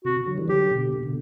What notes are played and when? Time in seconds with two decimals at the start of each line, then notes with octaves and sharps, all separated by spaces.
0.05 C3 F#4
0.26 D3 F#3
0.38 E3 G3
0.48 D3 F#3 G4
0.70 B2 D3
0.93 B2
1.03 B2 D3